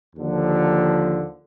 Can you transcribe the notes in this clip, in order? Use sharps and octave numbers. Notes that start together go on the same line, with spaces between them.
D#2 D3 F3